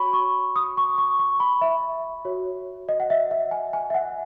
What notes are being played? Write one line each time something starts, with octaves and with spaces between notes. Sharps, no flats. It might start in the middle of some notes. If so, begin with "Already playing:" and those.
Already playing: F#4 C#5 B5 C#6
C#6
D#6
C#6
C#6
C#6
B5
E5
F#4 C#5
D#5
F#5
E5
E5
G#5
G#5
E5
F#5